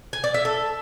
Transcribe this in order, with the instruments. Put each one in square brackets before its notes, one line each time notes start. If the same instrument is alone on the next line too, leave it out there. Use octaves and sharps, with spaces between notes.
[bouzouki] G#5
D5
E5
A4